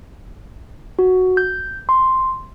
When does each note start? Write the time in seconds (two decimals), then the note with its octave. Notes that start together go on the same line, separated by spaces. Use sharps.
0.99 F#4
1.37 G6
1.89 C6